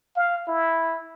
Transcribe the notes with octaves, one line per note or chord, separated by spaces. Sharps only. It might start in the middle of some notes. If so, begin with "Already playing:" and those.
F5
E4